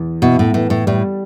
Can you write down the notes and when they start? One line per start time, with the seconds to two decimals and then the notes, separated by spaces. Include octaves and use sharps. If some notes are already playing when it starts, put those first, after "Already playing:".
Already playing: E2
0.22 B2 E4
0.39 A2
0.54 A2 E3
0.70 A2
0.87 A2 G3